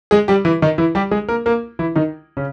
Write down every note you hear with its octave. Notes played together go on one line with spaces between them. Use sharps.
G#3 G#4
G3 G4
E3 E4
D#3 D#4
E3 E4
G3 G4
G#3 G#4
A#3 A#4
A#3 A#4
E3 E4
D#3 D#4
C#3 C#4